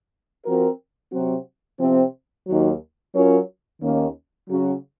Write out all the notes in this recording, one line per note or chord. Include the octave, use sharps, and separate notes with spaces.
F3 C4 F#4 A#4
C3 F#3 C4 F#4
C3 F3 C4
D#2 D#3 F#3
F#3 C#4 F4 A#4 C#5
D#2 D#3 A#3 C#4
C#3 F#3 C#4 F#4